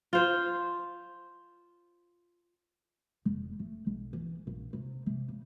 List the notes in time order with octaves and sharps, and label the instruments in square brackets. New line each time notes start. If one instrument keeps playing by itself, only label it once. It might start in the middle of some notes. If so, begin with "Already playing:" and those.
[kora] F4 C5
[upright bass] F1
A3
B1
E3
A#1
C3
C3
C#3